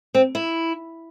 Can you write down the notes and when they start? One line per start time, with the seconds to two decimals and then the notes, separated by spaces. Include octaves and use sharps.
0.14 C4
0.35 E4